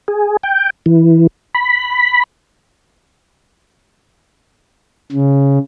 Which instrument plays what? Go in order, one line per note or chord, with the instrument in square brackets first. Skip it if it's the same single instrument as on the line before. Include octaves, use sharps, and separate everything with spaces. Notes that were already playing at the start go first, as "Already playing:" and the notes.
[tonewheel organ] G#4
G5
E3
B5
[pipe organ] C#3